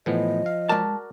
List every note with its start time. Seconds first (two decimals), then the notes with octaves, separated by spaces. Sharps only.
0.06 A2 E3 F3 B3 D#5
0.46 F5
0.69 G#3 F#4 A#4 D5 A5